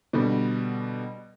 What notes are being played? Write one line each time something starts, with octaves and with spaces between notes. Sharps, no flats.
B2 D3 G3